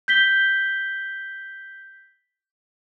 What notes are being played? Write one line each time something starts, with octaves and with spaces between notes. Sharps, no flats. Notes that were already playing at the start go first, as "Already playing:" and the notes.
G6 B6 G7